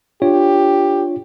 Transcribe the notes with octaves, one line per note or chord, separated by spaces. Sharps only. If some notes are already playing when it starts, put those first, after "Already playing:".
D4 F4 G4 C#5